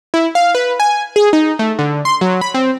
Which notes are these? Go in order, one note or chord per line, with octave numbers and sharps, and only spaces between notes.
E4
F5
B4
G#5
G#4
D#4
A3
D3
C6
F#3
B5
C4